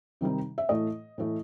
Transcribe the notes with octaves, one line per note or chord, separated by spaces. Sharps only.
C3 D#3 G3 D#4
E5
A2 E3 A3 D#5
A2 E3 A3